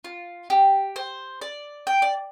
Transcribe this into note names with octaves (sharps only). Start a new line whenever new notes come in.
F4
G4
C5
D5
G5
D5